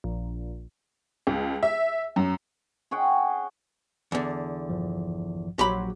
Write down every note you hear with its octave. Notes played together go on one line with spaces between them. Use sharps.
A#1
C#2
E5
F#2
G#4 C#5 F#5 G5
E2 D3
A#1 G2 F3
A#1 F#3 G4 B5 C6